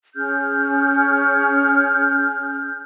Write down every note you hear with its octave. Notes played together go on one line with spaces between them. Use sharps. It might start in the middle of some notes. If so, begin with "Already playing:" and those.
C#4 G#4 F6 G6